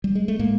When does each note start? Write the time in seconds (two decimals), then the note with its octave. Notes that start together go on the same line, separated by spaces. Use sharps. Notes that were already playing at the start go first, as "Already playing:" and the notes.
0.04 G3
0.15 G#3
0.28 A3
0.39 A2 G#3 A#3